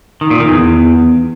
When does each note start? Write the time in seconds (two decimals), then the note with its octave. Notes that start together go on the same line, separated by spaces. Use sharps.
0.21 D#3
0.30 A#2
0.40 D#3
0.49 E2